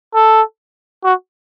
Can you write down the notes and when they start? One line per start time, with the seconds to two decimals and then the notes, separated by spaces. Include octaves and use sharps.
0.15 A4
1.04 F#4